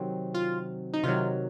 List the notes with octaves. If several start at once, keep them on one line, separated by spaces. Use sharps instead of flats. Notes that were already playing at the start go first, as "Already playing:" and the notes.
Already playing: C3 D#3 F#3 C4
F4
D#4
C3 D#3 F#3 F4